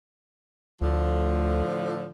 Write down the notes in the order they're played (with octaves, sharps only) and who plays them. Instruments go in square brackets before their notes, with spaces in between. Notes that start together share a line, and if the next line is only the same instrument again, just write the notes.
[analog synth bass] D2 [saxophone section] A2 D3 F3